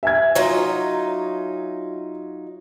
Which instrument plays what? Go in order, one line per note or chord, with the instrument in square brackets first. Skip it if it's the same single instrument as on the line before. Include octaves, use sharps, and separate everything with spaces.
[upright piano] E5 G#5 G#6
[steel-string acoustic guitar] F#3 D#4 F4